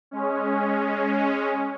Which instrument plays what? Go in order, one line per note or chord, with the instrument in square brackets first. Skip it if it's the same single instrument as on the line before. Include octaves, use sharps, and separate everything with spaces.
[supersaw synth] G#3 C#4